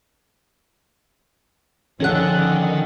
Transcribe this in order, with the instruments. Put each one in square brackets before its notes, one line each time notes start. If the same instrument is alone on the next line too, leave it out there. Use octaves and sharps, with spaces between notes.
[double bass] D3 F3 [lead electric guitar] D#3 [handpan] C#4 A4 F#5 [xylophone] C#5 F#6